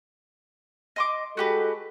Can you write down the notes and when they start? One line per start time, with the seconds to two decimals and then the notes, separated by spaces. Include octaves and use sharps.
0.96 D#5 C6 D6
1.37 G#3 F#4 G4 A4 B4